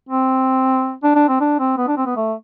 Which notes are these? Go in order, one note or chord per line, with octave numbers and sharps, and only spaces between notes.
C4
D4
D4
C4
D4
C4
B3
D4
C4
B3
A3